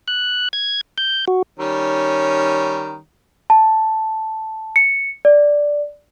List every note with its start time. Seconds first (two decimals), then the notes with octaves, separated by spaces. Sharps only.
0.08 F#6
0.53 G#6
0.98 G6
1.28 F#4
1.59 D#3 G3 C#4
3.50 A5
4.76 C#7
5.25 D5